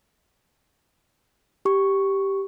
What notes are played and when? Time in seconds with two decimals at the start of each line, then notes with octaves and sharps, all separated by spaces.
1.65 G4 C#6